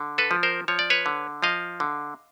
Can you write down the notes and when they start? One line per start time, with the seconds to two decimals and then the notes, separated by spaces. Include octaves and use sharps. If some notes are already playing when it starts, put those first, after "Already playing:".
Already playing: D3
0.18 A4 B4
0.31 F3
0.43 A#4 C5
0.68 F3 C#5
0.79 D5
0.90 B4 C#5
1.06 D3
1.43 F3 D#5 F5
1.80 D3